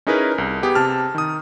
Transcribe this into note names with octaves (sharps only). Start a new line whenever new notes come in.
C#4 D#4 E4 G#4 A#4 B4
C2
B3 G4 G#4
C3 A5 F6
D#3 D#6